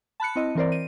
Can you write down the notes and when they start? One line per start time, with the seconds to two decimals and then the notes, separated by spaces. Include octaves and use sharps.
0.20 A5 B5 F#6 C#7
0.36 C4 E4 D#5
0.55 E3 C4 A#4 C5 D5
0.72 D#7